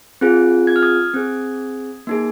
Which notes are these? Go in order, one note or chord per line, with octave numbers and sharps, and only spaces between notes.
C4 F4 G#4
G#6
F6
D#6 G#6
C4 G#4
A#3 D#4 G#4